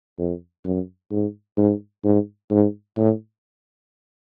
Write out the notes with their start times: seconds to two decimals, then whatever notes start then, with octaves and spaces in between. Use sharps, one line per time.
0.18 F2
0.65 F#2
1.11 G#2
1.58 G#2
2.04 G#2
2.51 G#2
2.97 A2